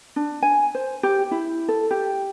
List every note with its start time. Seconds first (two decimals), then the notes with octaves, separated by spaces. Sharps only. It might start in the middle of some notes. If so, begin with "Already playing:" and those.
0.16 D4
0.42 G#5
0.75 C5
1.03 G4
1.31 E4
1.68 A4
1.91 G4